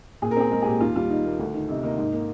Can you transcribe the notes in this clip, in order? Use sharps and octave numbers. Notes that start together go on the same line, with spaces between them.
A#2 G#4
A#4
C4 G#4
G#3 A#4
G#4
A#2 G4
D#2 F4
G3 F4
D#3 D#4
A#3
D2
D#3
C3 D#4
A#3 D#4
G#2
A#3